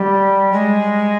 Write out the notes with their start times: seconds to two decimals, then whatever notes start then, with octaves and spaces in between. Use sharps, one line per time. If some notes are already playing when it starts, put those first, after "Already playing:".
Already playing: G3
0.52 G#3